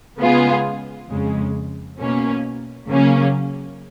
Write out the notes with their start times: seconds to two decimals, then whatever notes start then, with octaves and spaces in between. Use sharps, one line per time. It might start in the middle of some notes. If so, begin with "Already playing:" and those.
0.20 C#3 G#3 B3 F4 G#4
1.10 F2 C#3 G#3
1.99 B2 A#3 C#4
2.89 C#3 F#3 A#3 C#4